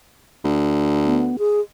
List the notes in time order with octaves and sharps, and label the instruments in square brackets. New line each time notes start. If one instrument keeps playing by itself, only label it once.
[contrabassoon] D2
[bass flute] B3
G#4